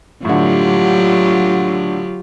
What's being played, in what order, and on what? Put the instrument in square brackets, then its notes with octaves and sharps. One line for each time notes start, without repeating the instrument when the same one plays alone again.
[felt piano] A2 D3 [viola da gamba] F#3 F4 G4